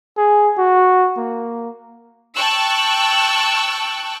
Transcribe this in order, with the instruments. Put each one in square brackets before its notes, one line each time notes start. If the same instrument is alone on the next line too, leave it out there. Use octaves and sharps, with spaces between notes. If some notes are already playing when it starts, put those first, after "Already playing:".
[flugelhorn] G#4
F#4
A#3
[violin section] G5 A5 C#6 E6 F#6